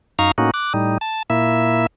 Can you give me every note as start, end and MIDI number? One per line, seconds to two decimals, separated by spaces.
0.19 0.31 42
0.19 0.31 63
0.19 0.31 77
0.19 0.31 82
0.19 0.31 85
0.38 0.51 45
0.38 0.51 58
0.38 0.51 61
0.38 0.51 63
0.38 0.51 66
0.54 0.73 86
0.54 0.73 90
0.74 0.98 45
0.74 0.98 55
0.74 0.98 63
1.01 1.23 81
1.30 1.86 46
1.30 1.86 58
1.30 1.86 64
1.30 1.86 76